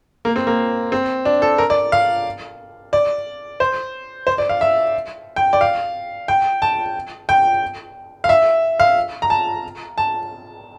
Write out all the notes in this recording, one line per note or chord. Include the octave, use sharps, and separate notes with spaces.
A#3
C4
A#3
C4
D4
A4
A#4
D5
F5
D5
C5
C5
D5
F5
E5
G5
D5
F5
G5
A5
G5
F5
E5
F5
A#5
A5
A5